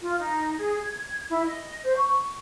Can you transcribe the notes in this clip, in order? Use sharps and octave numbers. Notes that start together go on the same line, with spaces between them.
F4
D#4
G#4
G#6
E4
D#5
C5
C#6